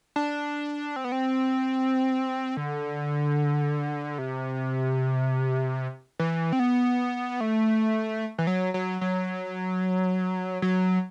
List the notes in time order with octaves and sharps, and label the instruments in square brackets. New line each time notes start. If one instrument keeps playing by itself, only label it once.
[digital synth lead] D4
C4
B3
C4
D3
C3
E3
C4
B3
A3
E3
F#3
F#3
F#3
F#3